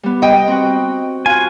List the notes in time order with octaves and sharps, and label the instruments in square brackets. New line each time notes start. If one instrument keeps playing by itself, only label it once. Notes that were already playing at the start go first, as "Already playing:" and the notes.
[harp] G3 B3
[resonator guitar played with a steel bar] D#5 G5
[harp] C4 F#4
[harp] F4 F#4 [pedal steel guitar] G#5